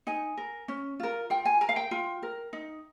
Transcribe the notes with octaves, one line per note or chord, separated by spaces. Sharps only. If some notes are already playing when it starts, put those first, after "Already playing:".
D#4 G#5
A#4
C#4
F4 A#4
F4 G5
G#5
A#4 A#5
F5
G5
F4
A#4
D#4